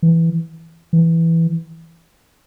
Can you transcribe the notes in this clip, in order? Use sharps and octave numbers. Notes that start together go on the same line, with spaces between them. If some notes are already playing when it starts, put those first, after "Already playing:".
E3
E3